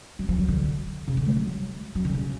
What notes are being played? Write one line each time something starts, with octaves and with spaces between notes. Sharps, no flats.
F#3
F3
F#3
D3
C#3
D3
G#3
F#3
F#3
D3
C#3